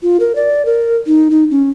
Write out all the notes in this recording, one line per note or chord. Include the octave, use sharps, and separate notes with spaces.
F4
A#4
D5
A#4
D#4
D#4
C#4